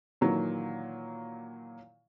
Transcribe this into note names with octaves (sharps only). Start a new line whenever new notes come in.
A#2 D#3 E3 F#3